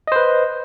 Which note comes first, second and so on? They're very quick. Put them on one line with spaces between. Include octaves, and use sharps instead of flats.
D#5 C5 B4